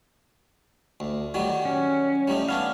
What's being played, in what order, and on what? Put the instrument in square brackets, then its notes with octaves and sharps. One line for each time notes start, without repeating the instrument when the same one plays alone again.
[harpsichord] D2
D#3 F#3 G3
[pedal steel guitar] C#4
[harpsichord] G3 A3 D#4
[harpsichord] B3 C#4 D4 [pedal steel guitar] F5